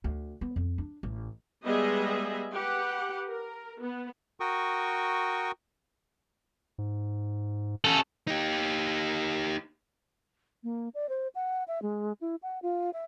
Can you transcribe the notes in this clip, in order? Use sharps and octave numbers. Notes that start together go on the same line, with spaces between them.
D2
B3
F2
D4
A1
G3 G#3 B3 G#4 D#5 E5
G4 B4 F#5
A#4
B3
F#4 A#4 G5 C#6 D#6
G#2
C#4 A4
D#4 G4
A#3
D5
C5
F#5
E5
G#3
E4
F#5
F4
E5